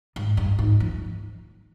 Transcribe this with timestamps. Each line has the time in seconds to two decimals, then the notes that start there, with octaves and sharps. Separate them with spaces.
0.16 G#2
0.37 G2
0.59 G#2
0.80 F3